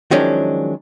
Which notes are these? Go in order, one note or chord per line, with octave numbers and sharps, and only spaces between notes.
D#3 F3 F#3 G#3 C#4 D4